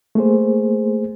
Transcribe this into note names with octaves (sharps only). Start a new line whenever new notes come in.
A3 A#3 G#4 C5